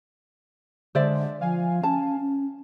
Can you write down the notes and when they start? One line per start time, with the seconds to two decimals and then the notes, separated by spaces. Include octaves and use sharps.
0.95 D3 G#3 C5 D5 E5
1.41 F3 F5 G#5
1.83 C#4 A5
2.21 C#4